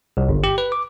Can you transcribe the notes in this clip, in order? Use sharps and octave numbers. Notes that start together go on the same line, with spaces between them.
C2
G1
G4
B4
D6